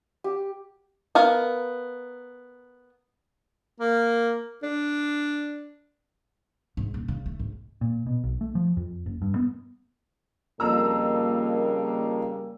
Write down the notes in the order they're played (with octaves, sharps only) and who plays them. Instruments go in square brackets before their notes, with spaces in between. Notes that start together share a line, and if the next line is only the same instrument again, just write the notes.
[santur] G4
[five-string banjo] B3 A#4 F5
[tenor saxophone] A#3
D4
[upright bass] G#2
D#1
C#3
A3
G#2
[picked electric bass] A#2
B2
B1
A3
F3
F2
F#1
G2
B3
[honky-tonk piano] F2 A#5 E6 [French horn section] C#3 G3 A#3